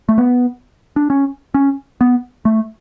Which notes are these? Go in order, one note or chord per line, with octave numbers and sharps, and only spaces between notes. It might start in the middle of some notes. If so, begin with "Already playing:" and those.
A3
B3
D4
C#4
C#4
B3
A3